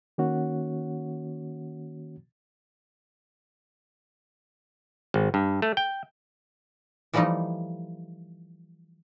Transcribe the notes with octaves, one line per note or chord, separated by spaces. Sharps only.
D#3 A#3 C#4 F#4 C#5 F#5
G#1
G2
A3
G5
E3 F3 G3 A3 D#4 F4